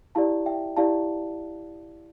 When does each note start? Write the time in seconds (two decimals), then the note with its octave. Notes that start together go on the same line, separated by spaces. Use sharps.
0.15 E4 G4 D5 F5 A5
0.46 E5 G5
0.77 E4 G4 D5 F5 A5